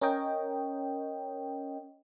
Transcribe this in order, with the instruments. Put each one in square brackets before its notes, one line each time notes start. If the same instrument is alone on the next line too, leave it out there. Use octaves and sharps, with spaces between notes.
[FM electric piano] C#4 A#4 C#5 D#5 G5